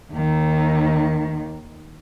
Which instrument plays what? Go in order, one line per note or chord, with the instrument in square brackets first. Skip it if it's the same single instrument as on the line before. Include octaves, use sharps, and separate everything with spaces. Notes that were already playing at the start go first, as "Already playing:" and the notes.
[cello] D#2 D#3